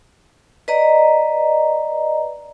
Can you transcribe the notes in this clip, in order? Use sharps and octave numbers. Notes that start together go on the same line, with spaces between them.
B4 D5 D#5 A#5